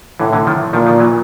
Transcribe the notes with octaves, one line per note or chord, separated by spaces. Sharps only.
A2 D3 E3
D3 E3
D#3 F3
A#2 D#3 F3
D#3 F3
E3 F#3